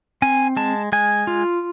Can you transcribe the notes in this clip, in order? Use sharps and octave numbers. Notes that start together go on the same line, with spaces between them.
C4 G#5
G#3 A5
G#3 G#5
F4